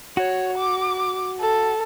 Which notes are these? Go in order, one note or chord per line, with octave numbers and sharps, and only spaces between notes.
F#4 C#5
D6
A4